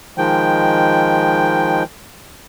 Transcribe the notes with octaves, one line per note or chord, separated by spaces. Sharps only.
D#3 F3 G#3 G5